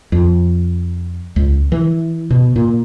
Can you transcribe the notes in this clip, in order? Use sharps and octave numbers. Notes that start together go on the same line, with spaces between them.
F2
C#2
E3
B2
A#2